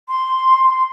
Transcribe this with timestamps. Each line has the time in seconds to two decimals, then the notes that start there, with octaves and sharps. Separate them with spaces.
0.08 C6
0.66 C6